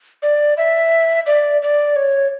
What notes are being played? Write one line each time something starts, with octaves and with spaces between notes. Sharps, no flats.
D5
E5
D5
D5
C#5